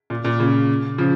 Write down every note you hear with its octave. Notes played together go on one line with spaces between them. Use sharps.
A#2
A#2
A#2 C#3
C#3 F3